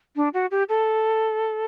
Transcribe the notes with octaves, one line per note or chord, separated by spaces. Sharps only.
D4
F#4
G4
A4